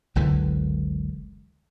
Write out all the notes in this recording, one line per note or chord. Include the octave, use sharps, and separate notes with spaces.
F#1 C#2 D3 E3